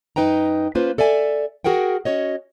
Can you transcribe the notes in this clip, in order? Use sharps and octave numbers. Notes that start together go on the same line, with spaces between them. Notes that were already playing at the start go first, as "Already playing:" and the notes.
F#2 D#4 B4 G5 A#5
A#3 C#4 F4 B4 C5
A4 D5 E5 G#5
F#4 G#4 A#4 F#5 G5
C#4 F#4 C#5 D#5